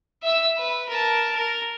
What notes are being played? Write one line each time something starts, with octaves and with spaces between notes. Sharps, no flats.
E5 E6
B4
A#4 A5
A#4